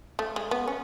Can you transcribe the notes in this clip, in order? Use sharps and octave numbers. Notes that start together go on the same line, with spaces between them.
A3
G#3
B3
C#4